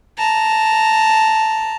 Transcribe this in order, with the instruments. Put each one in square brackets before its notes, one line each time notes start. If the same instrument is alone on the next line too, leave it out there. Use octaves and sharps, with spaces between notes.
[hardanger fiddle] A5 A#5